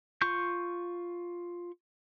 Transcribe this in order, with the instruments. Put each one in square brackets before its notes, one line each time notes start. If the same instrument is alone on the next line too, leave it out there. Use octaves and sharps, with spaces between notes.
[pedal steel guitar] F4 C#6 G6